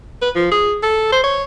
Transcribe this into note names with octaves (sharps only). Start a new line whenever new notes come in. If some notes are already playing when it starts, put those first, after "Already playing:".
B4
F3
G#4
A4
C5
C#5